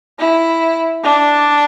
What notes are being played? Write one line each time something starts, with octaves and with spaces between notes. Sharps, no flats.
E4
D4